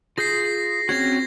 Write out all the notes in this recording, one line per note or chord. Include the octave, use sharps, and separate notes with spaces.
F4 G#4 G6 A#6 C7
C4 C#4 F#4 G#6 A#6